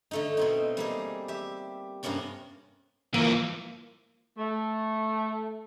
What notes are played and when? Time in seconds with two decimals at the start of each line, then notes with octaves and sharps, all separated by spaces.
0.11 D3 A3 D#4
0.37 B2 C4 D#4
0.77 G3 A#3 G#4
1.28 G4 E5
2.03 G2 C3 A#3 B3 C#4 D4
3.14 E3 F3 A#3
4.38 A3